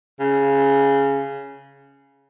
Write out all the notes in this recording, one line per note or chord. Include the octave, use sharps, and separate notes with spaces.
C#3